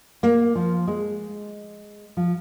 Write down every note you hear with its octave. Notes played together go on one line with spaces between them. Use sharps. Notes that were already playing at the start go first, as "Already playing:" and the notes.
A#3
F3
G#3
F3